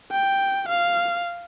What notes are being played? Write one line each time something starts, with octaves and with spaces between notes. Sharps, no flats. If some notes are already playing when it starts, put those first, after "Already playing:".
G5
F5